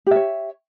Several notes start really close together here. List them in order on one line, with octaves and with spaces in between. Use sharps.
G4 E5 C#5